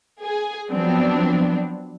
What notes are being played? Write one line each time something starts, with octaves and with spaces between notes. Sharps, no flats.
G#4
F3 F#3 B3 C4 D4